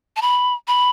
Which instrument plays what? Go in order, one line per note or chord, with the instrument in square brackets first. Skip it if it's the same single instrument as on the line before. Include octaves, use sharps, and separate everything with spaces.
[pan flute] A5
B5
B5